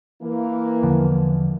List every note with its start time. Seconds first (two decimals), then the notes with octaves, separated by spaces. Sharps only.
0.22 E3 A#3
0.82 E2 D3 F3